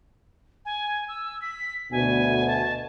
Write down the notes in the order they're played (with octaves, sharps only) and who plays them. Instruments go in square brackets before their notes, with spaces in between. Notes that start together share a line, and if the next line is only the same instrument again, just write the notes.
[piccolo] G#5
E6
B6
[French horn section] D2 B2 [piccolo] G#5
[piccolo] A5